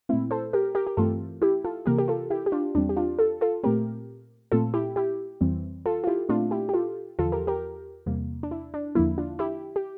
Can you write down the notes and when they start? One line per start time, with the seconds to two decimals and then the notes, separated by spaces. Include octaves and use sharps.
0.09 A#2 A3 C4 E4
0.31 A4 C5
0.53 G4 A#4
0.75 G4 A#4
0.87 G4
0.97 G2 E3 A3 C4 F4 A4
1.42 E4 G4
1.65 F4 A4
1.86 C3 E3 A#3 G4 A#4
1.99 G4
2.08 F4 A4
2.30 E4 G4
2.46 G4
2.52 D4 F4
2.75 E2 E3 G3 C4 D4
2.89 G4
2.97 D4 F4
3.19 F4 A4
3.41 F4 A4
3.64 A#2 A3 C4 G4 A#4
4.52 A#2 A3 C4 F4 A4
4.74 E4 G4
4.96 E4 G4
5.41 F2 E3 G3 C4
5.86 F4 A4
6.04 F4
6.07 E4 G4
6.29 A#2 A3 C4 D4 F4
6.51 E4 G4
6.69 G4
6.73 F4 A4
7.19 E2 D3 F3 F4 A4
7.32 G4 A#4
7.47 G4 A#4
8.06 E2 C3 G3 A#3
8.43 D4
8.51 E4
8.74 D4
8.95 E2 D3 F3 A#3 E4
9.18 D4 F4
9.39 E4 G4
9.76 G4